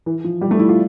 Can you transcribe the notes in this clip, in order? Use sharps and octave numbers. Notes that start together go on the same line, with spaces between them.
E3
F3
G3
A3
E4
F4